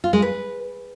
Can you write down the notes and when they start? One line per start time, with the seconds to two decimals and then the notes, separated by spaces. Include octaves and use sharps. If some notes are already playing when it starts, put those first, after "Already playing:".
0.04 F4
0.13 G#3
0.22 B4